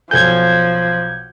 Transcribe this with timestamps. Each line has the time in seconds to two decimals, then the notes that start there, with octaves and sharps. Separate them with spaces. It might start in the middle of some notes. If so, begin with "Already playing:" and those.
0.11 B1 F3 A4 G#5 G6 G#6